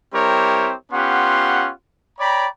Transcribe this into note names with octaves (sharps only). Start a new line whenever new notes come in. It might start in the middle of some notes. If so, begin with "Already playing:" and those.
G3 C4 E4 G4 A#4 C#5
B3 C#4 F4 G4 F#5 C6
C#5 D5 G5 A#5 B5